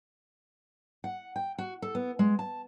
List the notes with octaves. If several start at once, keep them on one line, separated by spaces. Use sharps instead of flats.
F#5
G5
F#4
A4
B3
G#3
A5